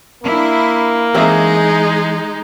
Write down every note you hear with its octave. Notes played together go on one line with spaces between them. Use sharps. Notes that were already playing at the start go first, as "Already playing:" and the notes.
A#3 D4 E4
E3 G#3 C4 D#4 G#4 E5